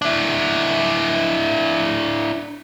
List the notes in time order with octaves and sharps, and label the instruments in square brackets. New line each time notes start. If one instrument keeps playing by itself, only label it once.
[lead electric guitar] D4 E4